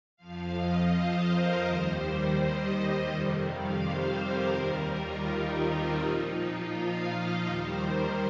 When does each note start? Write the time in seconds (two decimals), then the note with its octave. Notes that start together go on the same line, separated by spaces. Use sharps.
0.17 F2 F3 F5
0.53 D#5
0.90 C5
1.26 A#4
1.63 D#2 D#3 G3 C5
1.99 C5
2.36 D#5
2.72 D#5
3.07 F2 C3 D#3 G3
3.44 F5
3.80 C5
4.17 A#4
4.53 D#2 D#3 G3
4.89 F4
5.25 D#4
5.62 C4
5.98 A#2 F3 D#4
6.35 F4
6.71 F5
7.08 D#5
7.44 D#2 D#3 G3 C5
7.80 A#4